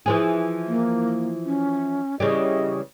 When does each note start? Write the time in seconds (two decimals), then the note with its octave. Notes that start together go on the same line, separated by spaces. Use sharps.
0.06 E3 F3 G#4
0.68 A#3
1.45 C#4
2.20 C#3 E3 G3 D#5